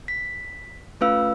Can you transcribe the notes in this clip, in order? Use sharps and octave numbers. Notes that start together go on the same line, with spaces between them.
B6
A3 C#4 F4 B4 F5 E6